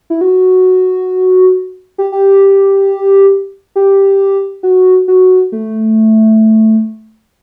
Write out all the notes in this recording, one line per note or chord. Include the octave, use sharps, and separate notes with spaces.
E4
F#4
G4
G4
G4
F#4
F#4
A3